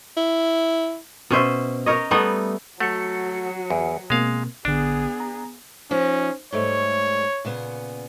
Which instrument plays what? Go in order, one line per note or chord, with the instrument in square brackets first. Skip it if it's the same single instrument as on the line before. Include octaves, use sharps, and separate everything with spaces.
[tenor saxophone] E4
[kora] B2 C#4 C5 E5
D#4 A#4 C#5 D#5
G3 A3 B3 D#4
[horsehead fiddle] F#3 F#4 [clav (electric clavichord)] A3 [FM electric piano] F#5 C#7
[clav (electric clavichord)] E2
[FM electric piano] B2 A#3 C4 [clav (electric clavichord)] G#3 F5
[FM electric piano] A1 D3 [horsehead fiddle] B3 G#4 [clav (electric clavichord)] D4
[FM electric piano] A#5
[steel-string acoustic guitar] F3 D#4 [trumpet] C#4
[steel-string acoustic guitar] G#2 G3 A3 [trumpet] C#5
[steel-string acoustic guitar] A#2 C#3 B3